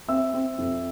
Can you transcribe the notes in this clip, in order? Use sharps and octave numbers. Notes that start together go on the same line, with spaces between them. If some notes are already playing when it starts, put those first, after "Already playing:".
C4 E5 E6
C4
F2